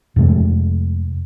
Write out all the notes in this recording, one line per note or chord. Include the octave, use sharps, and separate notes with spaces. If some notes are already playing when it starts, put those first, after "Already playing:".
F2 C3 G#3 A3